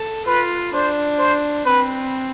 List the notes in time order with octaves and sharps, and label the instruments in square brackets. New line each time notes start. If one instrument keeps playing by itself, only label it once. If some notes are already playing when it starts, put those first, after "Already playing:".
Already playing: [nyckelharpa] A4
[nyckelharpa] F4 [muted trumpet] B4
[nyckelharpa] D4 [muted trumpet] C5
[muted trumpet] C5
[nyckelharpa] C4 [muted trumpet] B4